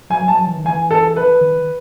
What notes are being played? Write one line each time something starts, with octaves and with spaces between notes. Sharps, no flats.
F#3 G#5
F#3 A5
E3
D#3
E3 G#5
A4
B4
D#3